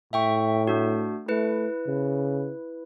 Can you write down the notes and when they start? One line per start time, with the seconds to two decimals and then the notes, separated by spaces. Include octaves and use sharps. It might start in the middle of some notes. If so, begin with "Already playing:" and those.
0.13 A2 E5 G5 C#6
0.67 A3 D4 F#4
1.28 A3 E4 B4
1.87 C#3